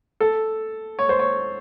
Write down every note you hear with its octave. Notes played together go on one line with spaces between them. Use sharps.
A4
C#5
C5
C#5